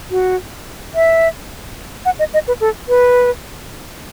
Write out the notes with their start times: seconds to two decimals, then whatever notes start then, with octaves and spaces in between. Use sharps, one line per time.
0.11 F#4
0.95 E5
2.05 F#5
2.19 D#5
2.34 D#5
2.48 B4
2.61 A4
2.88 B4